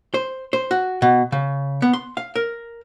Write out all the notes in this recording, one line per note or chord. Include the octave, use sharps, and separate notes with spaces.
C5
C5
F#4
B2
C#3
B3
C6
F5
A#4